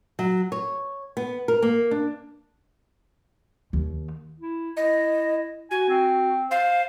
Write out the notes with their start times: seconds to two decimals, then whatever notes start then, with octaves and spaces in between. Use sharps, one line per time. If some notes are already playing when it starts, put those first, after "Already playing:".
0.19 F#3
0.52 C#5
1.17 B3
1.48 A#4
1.62 A#3
1.91 D4
3.73 D#2
4.40 E4
4.77 E4 D#5
5.71 F#4 G#5
5.89 C4
6.51 C5 F5